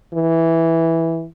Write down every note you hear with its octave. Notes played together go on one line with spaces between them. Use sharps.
E3